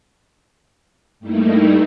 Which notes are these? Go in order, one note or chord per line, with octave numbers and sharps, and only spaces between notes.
G2 G3 A3 A#3 D#4 E4